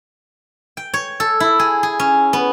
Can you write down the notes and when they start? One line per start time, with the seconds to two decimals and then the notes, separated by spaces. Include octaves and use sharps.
0.77 G5
0.94 C#5
1.20 A4
1.40 E4
1.59 G#4
1.83 G#4
2.00 C#4
2.33 B3